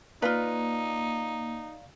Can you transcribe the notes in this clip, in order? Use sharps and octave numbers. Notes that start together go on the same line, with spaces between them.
A#3 D#4 F4 B4 D5 F5 A#5